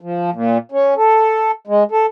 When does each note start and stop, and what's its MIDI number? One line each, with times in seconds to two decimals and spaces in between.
0.01 0.30 53
0.33 0.58 46
0.72 0.94 61
0.97 1.51 69
1.67 1.83 56
1.91 2.06 69